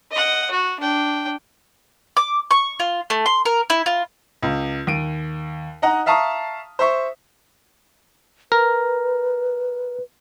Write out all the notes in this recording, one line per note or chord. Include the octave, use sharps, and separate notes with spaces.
D#5 F#5
F#4
D4 G5
D6
C#6
F4
A3
C6
A#4
E4
F4
C#2
D#2 D7 D#7
D#4 D#5 F#5 A#5
E5 F5 A5 A#5 C#6 D#6
C5 E5 C#6
A#4 B4